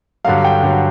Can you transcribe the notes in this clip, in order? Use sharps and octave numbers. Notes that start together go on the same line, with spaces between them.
G2 D3 F#3 F5
G5
G2 D3 F#3